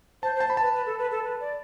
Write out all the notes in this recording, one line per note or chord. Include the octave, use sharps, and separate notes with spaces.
C5 A5
C5
A5
B5
B4 A5
B4
A4
B4
A4
B4
D5